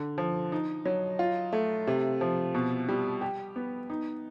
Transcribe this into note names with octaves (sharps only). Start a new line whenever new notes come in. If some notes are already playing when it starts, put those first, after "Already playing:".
Already playing: D3
F3
D#4
F#3
F4
A3
C3
F3
B2
G3
G4
B3
D#4